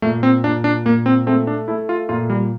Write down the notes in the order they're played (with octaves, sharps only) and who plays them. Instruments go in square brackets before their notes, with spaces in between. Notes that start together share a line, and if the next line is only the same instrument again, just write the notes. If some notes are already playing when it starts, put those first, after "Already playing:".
[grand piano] A#2 [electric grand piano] A3
[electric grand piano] C4
[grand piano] A#2 [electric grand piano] D4
[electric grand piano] D4
[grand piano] A#2 [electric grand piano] A#3
[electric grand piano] C4
[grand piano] A3 [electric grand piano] C4
[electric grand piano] D4
[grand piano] A3 [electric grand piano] E4
[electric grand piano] F4
[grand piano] A#2 [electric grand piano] F4
[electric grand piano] G3